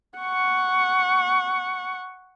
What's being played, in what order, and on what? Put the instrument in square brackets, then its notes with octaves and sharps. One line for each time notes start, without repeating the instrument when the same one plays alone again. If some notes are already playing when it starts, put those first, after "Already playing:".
[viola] F#5 C#6